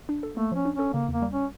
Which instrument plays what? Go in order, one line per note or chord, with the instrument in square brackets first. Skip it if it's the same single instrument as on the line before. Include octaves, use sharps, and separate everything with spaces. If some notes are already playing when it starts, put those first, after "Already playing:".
[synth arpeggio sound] D4
A4
[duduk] A3 [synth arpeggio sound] A#3
[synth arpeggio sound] F3 [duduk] C#4
[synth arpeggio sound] D4
[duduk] C#4 [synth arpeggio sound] A4
[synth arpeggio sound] C#3 [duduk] A#3
[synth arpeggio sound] E2 [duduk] A#3
[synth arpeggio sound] G3
[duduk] C#4